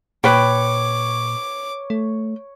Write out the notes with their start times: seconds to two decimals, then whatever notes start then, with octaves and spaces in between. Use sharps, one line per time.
0.24 A#2 B4 C#5 G5 D6
1.90 A3